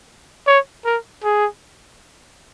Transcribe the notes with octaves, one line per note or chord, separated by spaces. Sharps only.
C#5
A#4
G#4